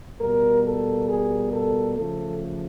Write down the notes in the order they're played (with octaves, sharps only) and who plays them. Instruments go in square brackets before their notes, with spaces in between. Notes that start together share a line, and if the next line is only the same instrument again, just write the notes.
[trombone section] B2 G3 A#3 A#4
A4
G#4
A4
C#3 F3 A3 A4